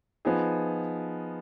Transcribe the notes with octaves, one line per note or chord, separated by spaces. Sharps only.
F3 B3 D#4 G#4